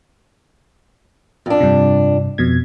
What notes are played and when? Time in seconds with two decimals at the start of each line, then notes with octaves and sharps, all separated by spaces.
1.46 F2 D4
1.60 G2 C3
2.38 F2 B2 G#6